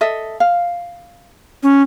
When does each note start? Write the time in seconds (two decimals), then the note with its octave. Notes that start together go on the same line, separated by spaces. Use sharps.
0.01 A4 D#5 E5
0.40 F5
1.63 C#4